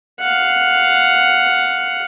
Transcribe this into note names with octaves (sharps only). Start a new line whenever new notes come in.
F5 F#5